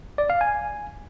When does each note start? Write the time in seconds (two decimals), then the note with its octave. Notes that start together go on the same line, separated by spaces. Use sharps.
0.18 D5
0.30 F5
0.41 G#5